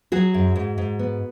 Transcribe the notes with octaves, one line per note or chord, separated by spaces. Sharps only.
F#3 F#4 G#4
F#2
G#2
G#2
B3